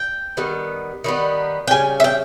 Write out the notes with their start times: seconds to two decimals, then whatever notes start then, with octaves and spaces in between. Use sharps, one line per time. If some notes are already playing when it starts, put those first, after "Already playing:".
Already playing: G5
0.37 D#3 G3 B3
1.04 D#3 G3 B3
1.68 G5
1.71 C#3 G3 G#5
2.00 E5
2.04 G5